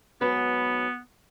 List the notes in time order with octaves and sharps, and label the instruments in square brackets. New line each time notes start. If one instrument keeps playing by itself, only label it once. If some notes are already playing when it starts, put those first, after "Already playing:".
[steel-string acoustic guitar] G#2 F#3 B4 [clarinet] B3